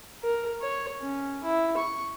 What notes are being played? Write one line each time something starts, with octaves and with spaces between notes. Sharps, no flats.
A#4
C#5
C#4
E4
C#6